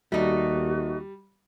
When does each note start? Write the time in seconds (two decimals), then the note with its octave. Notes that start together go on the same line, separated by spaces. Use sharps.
0.12 D#2 G3 A3 D#4 F#4